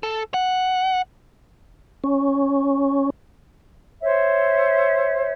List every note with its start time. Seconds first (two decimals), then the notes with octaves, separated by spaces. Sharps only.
0.03 A4
0.34 F#5
2.04 C#4
4.01 C5 C#5 E5